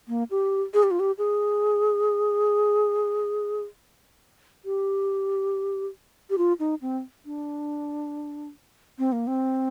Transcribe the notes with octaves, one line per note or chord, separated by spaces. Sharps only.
A#3
G4
G#4
G4
F4
G4
G#4
G4
G4
F4
D#4
C4
D4
C4
A#3
C4